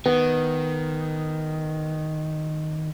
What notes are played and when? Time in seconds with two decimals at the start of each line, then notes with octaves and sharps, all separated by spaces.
0.06 D#3 B3